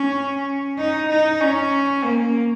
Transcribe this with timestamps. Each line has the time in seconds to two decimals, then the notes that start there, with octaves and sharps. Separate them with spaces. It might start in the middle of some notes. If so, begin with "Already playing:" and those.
Already playing: C#4
0.78 D#4
1.10 D#4
1.40 C#4
2.04 A#3